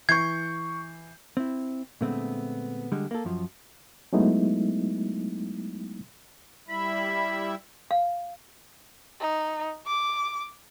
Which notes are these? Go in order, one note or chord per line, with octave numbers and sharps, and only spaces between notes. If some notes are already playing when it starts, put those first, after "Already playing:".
E3 C#6 G6 G#6 C7
C4 E4
A#2 D3 G#3 A3 B3 C4
D3 G3 G#3
A#3 A4
F#2 F3
F#3 G#3 A3 B3 D#4 E4
G3 E4 E5 B5
F5
D#4
D6